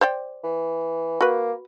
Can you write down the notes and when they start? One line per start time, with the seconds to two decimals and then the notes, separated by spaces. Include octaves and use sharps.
0.01 C5 D5 G5
0.44 E3
1.21 A#3 F#4 B4